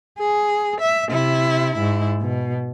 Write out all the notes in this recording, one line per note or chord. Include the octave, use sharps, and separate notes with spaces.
G#4
E5
C3 E4
G#2 E4
B2